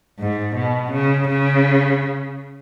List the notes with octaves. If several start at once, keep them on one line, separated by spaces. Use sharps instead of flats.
G#2
B2
C#3
C#3